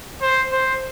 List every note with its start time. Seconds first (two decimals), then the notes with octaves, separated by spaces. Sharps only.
0.22 C5
0.52 C5